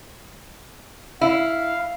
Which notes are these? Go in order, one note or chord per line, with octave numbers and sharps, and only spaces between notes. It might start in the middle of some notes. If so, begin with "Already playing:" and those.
E4 F5